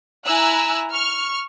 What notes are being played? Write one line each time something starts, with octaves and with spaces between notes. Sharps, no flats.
E4 G#5 A#5 E6 F#6
C#6 F6